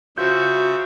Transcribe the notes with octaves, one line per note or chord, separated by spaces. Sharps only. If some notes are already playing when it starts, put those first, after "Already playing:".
C#3 F4 F#4 C5 E5 E6 G6